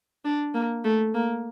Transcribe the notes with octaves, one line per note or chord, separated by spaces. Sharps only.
D4
A#3
A3
A#3